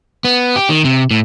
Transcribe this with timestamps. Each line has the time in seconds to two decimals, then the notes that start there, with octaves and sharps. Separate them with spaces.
0.25 B3
0.56 G4
0.69 D#3
0.85 C3
1.11 A2